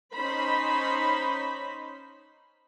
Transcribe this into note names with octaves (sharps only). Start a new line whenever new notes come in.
C#4 D#4 C5 B5